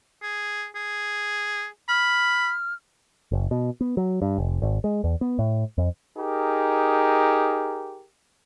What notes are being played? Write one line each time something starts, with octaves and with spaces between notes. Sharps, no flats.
G#4
G#4
B5 F6
F#1
B2
B3
F#3
G2
F1
G#1
G#3
E2
B3
A2
F2
D#4 G4 G#4 A#4